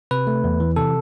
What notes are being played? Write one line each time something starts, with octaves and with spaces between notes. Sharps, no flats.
C3 B4
A3
E2
E3
C3 A4